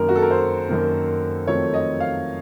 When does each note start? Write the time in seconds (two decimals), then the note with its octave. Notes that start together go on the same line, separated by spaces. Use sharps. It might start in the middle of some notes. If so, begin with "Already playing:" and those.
Already playing: F#2 D#3 A#3 A#4
0.09 F#4
0.16 A4
0.22 A#4
0.31 C5
0.69 F#2 D#3 A#3
1.47 F2 D#3 F#3 A3 C4 C#5
1.74 D#5
2.00 F5